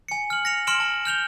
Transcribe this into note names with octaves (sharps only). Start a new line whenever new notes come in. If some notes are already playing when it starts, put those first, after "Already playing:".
G#5 C#7
F6 F#7
A#6 C#7 F7
C6 F6 D7 E7 F#7
A5
F6 G6 F7 G7